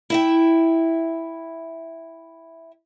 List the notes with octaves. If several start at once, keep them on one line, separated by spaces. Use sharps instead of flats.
E4 E5 G5